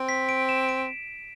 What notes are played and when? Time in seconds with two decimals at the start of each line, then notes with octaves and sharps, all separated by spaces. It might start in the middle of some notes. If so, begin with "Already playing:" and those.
Already playing: C4
0.09 B6
0.29 D7
0.49 E7
0.69 D7